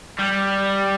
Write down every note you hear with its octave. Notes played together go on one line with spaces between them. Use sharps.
G3